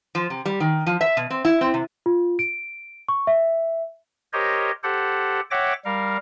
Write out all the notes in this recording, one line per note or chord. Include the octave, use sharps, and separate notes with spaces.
F3
C3
G3
D#3
F3
E5
B2
C4
E4
C4
C3
F4
D7
C#6
E5
G4 A#4 C5 C#5 D#5
G4 A4 C5 F#5
C#5 E5 F#5 G5 D6 A#6
G3 A#4 F5